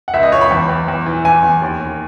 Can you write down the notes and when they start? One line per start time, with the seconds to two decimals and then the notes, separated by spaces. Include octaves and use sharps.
0.08 F#5
0.14 C#2 E5
0.23 D#5
0.32 C#2 C#5
0.41 B5
0.51 E2
0.69 E2
0.88 E2
1.06 E3
1.25 E2 G#5
1.43 E2
1.62 D#2
1.80 D#2